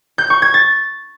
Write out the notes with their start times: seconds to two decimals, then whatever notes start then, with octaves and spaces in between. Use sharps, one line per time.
0.18 G6
0.30 C#6
0.42 G#6
0.54 A6